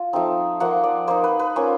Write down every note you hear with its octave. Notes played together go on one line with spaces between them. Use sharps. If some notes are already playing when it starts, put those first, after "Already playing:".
Already playing: F4
F3 A3 C4 D#4
F3 A#3 D#4 F#5
D5
A#3 D#4 C5
B4
B4
A#3 C#4 F4 C5